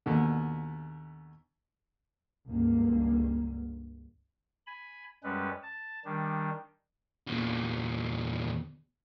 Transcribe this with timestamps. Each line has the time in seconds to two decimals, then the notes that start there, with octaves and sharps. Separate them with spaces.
0.06 D#2 B2 D3
2.47 C#2 G2 D3 A#3
4.67 G#5 B5
5.24 F#2 G3 G#3 C#4 B4
5.63 A5
6.05 D#3 G3 D4
7.27 E2 A#2